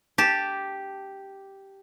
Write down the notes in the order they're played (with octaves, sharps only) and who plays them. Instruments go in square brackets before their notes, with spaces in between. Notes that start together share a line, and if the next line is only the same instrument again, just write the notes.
[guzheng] G4 A5